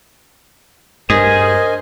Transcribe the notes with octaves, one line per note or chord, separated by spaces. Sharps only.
G2 G#4 A#4 C5 D#5 G#5